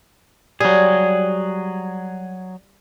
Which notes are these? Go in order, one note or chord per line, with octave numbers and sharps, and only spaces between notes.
F#3 G3 G#4